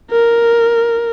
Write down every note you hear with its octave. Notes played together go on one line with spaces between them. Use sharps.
A#4